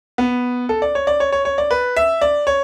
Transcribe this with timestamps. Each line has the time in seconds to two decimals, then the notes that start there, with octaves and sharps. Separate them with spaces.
0.18 B3
0.69 A4
0.82 D5
0.95 C#5
1.07 D5
1.20 C#5
1.32 C#5
1.45 C#5
1.58 D5
1.71 B4
1.96 E5
2.21 D5
2.47 C#5